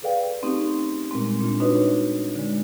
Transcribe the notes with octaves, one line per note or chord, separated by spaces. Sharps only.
G#4 A4 B4 D5 F5 G5
A3 C4 C#4 D#4 G4
A#2 G3 G#3 C4
A#2 D4 F4
D4 D#4 F#4 B4 C#5 D#5
D3 G#3